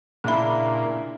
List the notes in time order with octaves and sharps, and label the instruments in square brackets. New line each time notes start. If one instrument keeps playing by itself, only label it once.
[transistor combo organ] A#2 [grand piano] C#3 D4 E4 [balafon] A#3 B5